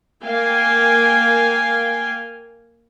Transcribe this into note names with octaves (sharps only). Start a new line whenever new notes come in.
A#3 F5 G5 G#5